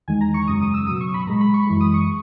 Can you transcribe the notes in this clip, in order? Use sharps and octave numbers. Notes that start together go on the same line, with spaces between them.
E2 D#3 G#3 G#5
A#5
C#6
F#2 C#3 G#3 D#6
D#6
E6
B2 F#3 D#6
C#6
B5
A#2 G#3 A#5
B5
C#6
F#2 E3 G#3
D#6
C#6